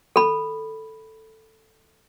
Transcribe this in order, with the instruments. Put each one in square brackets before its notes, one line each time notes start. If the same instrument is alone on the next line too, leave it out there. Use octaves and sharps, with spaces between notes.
[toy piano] A4 B5